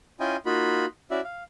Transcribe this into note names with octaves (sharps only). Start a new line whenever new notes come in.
C#4 E4 F4 D#5 G5 G#5
A#3 D#4 F4 F#4 B5
C#4 E4 F#4 D5 E5
F5